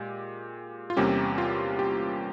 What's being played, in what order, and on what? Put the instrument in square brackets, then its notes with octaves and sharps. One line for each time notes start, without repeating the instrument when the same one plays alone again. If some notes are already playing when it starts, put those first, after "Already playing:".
Already playing: [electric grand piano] A#2 G#3 G4
F4
E2 C3 G3 A#3 C#4 G4
F4
G4